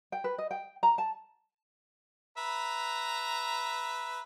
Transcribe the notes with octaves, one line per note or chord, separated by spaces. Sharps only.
G5
B4
D#5
G5
A#5
A5
B4 E5 A#5